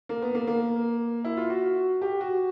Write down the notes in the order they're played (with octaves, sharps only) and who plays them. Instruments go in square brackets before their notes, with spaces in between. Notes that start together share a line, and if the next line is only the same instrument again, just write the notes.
[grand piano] A#3
B3
A#3
A#3
E4
F4
F#4
G4
F#4